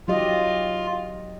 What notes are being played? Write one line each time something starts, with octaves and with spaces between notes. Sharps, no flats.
F#3 F4 G4 D#5